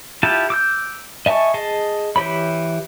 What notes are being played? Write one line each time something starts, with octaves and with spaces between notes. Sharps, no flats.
E4 F4 G4 A5
D6 E6 G6
D#5 E5 G#5 A5 C#6
G#4 D#5 A5
E3 G4 C#5 B5